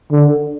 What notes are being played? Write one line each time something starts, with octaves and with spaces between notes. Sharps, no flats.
D3